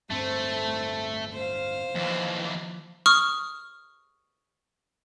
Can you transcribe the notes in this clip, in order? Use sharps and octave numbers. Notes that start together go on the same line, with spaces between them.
D1 G2 A3 C4 C5
C5 F5
D#2 E3 F3
C#6 D#6 F6